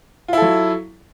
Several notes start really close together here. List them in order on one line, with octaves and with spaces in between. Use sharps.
F4 E4 A4 F#3